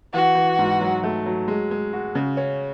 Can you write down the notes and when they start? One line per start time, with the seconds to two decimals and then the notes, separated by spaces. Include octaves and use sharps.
0.14 E3 F#4
0.35 E3
0.59 G#2
0.81 F#3
1.03 A3
1.26 F#3
1.48 G#3
1.71 G#3
1.93 F#4
2.15 C#3
2.37 C#4